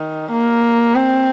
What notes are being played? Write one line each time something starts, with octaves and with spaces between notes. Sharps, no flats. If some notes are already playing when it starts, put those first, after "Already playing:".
Already playing: D#3
A#3
C4